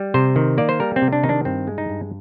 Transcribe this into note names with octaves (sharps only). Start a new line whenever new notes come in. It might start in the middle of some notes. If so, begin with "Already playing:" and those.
Already playing: G3
C3 C5
D#3
A#3 D5
C5
G3 A#4
C4
C3
D4
D#3 D#4
D4
G2 C4
G#3
D#4
G2